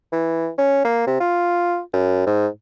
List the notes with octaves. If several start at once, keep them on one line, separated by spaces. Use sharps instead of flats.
E3
C#4
A#3
C3
F4
F#2
G#2